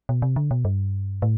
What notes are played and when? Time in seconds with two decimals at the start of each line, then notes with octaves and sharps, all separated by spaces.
0.09 B2
0.22 C3
0.36 D3
0.51 B2
0.65 G2
1.22 A2